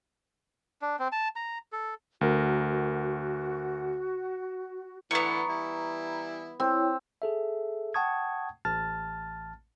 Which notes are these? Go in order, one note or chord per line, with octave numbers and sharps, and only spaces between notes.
D4
C4
A5
A#5
A4
D2 F#4 A#4
A2 D3 E3 B3 A#5 C#6
E3 G3 E4
C4 E4 C#5 G5
G#4 A4 E5
F#5 G5 A5 C#6 D#6 G#6
A1 A5 F6 A6